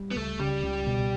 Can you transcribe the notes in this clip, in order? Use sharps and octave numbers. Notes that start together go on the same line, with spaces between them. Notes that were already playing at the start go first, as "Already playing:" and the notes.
Already playing: G3
B3
C#2 A3
C#3 G3
C#2
B2